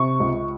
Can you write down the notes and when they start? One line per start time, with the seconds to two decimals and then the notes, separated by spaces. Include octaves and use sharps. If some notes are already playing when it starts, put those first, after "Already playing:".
Already playing: C3 C#6
0.20 C#2